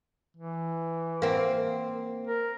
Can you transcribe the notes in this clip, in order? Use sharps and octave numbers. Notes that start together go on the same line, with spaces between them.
E3
A#3 C4
A#4